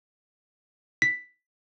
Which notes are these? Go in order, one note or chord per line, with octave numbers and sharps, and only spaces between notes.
B6